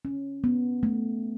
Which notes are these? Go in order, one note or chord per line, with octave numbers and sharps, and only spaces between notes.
C#4
B3
A3